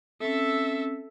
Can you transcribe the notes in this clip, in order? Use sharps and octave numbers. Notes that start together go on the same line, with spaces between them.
C4 C#4 A4 E5